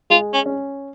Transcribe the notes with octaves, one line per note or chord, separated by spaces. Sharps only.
G#3 F4
C#4
C#4